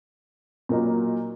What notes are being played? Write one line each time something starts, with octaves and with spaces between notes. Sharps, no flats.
A#2 F#3 A#3 D#4